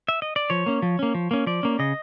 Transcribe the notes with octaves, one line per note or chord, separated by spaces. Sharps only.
E5
D#5
D5
F3 C#5
A#3 C#4
F3
A#3 C#4
F3
A#3 C#4
F3 D5
A#3 C#4
C#3 D#5